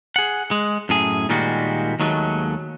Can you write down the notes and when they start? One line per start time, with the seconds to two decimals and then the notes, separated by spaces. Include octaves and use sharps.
0.16 G#4 F#5
0.51 G#3
0.89 F#2 A2 G#4
1.29 A#2 D#3 G3 G#3 A#3 F#4
2.00 D#2 D#3 F#3 G#3 A3